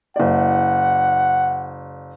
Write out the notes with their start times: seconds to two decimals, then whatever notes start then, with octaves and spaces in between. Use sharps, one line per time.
0.16 F#1 D5 F#5